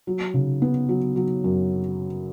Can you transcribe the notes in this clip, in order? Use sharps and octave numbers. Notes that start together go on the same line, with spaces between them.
F#3
C#3
B3
F#3
F#3
F#2